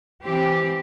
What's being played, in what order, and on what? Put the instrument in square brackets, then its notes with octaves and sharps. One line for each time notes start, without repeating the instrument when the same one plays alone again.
[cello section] E3 C4 G4